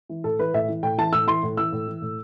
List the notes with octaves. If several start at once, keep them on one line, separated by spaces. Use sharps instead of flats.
E3
A2 A4
E3 B4
A2 E5
E3
A2 G5
E3 A5
A2 E6
E3 C6
A2
E3 E6
A2
E3
A2